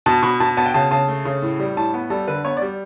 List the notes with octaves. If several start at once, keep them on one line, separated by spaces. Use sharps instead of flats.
B2 A5
B2 B5
B2 A5
B3 A5
G5
C#3 A5
C#3 A5
A3
C#3
A2
G3
A2 A5
B3
G3 A4
D3 B4
B3 C#5
D5
G3